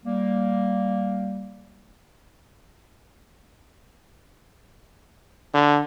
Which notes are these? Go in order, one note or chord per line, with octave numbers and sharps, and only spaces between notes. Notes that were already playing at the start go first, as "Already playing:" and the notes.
G3 A#3
D3